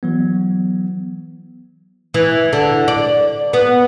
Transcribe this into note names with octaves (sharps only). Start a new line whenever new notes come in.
E3 F#3 B3
E3
D3
D5
B3